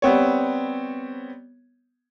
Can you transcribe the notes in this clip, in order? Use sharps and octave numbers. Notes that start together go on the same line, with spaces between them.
G3 B3 C4 C#5